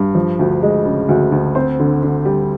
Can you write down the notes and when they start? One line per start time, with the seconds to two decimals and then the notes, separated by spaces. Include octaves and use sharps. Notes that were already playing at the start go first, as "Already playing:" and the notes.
Already playing: G2
0.15 F3
0.39 D2
0.63 G#3
0.86 C#3
1.09 D2
1.32 D2
1.55 C4 C5
1.80 D3
2.03 D3
2.25 G3